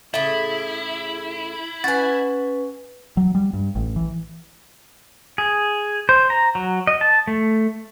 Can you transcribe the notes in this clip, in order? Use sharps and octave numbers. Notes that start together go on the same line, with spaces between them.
A2 C#3 E4 E5
C#4 B4 F#5 G#5 A6
F#3
G3
G2
A1
E3
G#4
C5
A#5
F#3
D#5
A5
A3